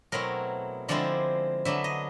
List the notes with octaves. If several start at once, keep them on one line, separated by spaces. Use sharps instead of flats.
B2 F#3 A3 C4 E4 A#4
D3 F3 G#3 C4 E4 D5
D3 F#3 B3 D4 E5
D#5